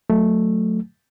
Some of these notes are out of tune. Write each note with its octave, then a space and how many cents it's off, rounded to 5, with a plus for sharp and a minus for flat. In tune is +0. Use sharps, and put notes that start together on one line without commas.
F#3 -20 A3 +0